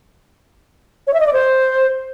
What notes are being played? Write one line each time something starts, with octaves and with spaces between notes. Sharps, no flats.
C#5
E5
D#5
D5
C5